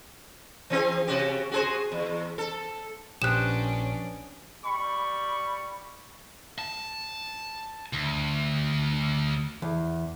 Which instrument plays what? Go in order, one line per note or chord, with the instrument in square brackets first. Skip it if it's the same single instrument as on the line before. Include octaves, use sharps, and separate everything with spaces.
[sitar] E3 C4 G#4
C3 F#4 G4
F#4 G#4 C5
E2
A4
[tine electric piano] A#1 [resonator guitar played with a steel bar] B3 G4 C5 [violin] C#4 D4 [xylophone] F#6 E7
[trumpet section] G3 B5 C#6
[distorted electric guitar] A5
D2
[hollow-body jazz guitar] E2